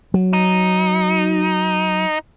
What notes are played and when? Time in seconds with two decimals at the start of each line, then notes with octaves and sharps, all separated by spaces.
0.14 F#3
0.33 D#4